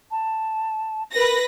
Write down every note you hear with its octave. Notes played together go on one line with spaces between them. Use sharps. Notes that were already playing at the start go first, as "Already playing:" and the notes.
A5
A#4 B4 A#6